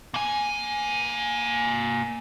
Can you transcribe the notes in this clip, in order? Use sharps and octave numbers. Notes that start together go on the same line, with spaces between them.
A#3 G#5